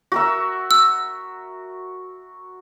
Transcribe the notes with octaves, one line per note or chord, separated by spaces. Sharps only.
F#4 A#4 E5
E6